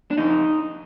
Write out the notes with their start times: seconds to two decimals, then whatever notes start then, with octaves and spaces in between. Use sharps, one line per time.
0.11 D4
0.18 F2 D#4